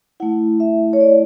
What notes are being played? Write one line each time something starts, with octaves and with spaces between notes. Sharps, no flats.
A3 E4 F#5
E5
C#5
D5